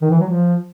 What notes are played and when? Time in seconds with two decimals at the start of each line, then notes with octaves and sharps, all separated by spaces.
0.02 D#3
0.11 E3
0.20 F#3
0.29 F3